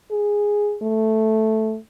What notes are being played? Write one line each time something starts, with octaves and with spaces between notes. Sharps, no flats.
G#4
A3